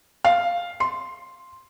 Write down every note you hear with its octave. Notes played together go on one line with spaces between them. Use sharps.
F5
C6